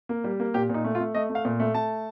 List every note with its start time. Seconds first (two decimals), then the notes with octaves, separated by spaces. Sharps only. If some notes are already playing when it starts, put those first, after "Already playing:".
0.09 A#3
0.24 G3
0.40 A#3
0.54 A#2 G4
0.70 A#2 D#4
0.84 A3
0.95 F4
1.00 A3
1.15 A3 D#5
1.30 A3
1.35 F5
1.45 A#2
1.60 A3
1.74 A3 A5